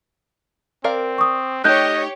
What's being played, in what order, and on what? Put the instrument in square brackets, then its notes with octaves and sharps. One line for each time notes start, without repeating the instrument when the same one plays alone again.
[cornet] C4 [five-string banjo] A#4 D5 F5
[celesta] C#6 D#6
[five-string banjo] A3 D#4 [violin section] G4 C#5 [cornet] D#5 [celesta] F#6 G6